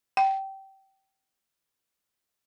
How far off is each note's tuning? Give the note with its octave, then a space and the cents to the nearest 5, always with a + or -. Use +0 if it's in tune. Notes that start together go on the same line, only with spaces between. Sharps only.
G5 -20